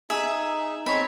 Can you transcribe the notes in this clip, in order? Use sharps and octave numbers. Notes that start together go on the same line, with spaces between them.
D#4 G#4 E5
G#3 C4 D#4 C#5 B5